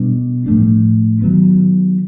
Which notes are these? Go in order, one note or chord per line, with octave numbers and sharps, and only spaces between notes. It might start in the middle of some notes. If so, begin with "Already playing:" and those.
Already playing: B2 G3 B3 D4
A2 F3 A3 D4
D#3 F#3 B3